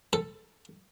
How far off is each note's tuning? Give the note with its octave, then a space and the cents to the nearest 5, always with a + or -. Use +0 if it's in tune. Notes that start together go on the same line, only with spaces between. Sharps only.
A4 +5